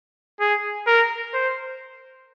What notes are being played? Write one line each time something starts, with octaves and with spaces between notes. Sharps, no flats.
G#4
A#4
C5